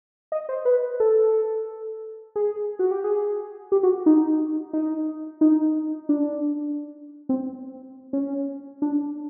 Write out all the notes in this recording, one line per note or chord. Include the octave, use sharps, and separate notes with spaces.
D#5
C5
B4
A4
G#4
F#4
G4
G#4
G4
F#4
D#4
D#4
D#4
D4
C4
C#4
D4